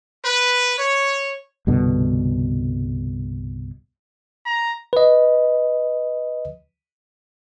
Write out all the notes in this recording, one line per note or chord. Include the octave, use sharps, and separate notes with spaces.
B4
C#5
C2 G2 B2 D3
A#5
B4 D#5